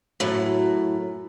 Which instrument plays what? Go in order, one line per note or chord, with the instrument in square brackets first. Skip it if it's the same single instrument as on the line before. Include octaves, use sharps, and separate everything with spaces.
[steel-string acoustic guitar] F#2 A2